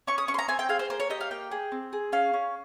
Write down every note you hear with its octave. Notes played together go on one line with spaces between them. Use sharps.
C#4 C#6
D#6
C#4 C#6
C6
A#5
C4 G#5
G5
G#4 F5
C5
A#3 C5
C#5
G4 D#5
F5
A#3 G5
G#4
C4
G#4
C#4 F5
C#4